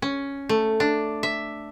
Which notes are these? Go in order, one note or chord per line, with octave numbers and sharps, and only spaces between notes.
C#4
A3
D4
E5